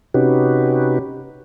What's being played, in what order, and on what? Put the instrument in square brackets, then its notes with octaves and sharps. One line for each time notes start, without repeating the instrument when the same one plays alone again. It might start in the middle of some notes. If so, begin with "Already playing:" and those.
[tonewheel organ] C3 C#4 D#4 F#4 G4 B4